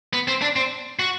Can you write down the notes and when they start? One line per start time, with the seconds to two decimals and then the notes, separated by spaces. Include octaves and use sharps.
0.13 B3
0.28 C4
0.42 D4
0.56 C4
0.99 F#4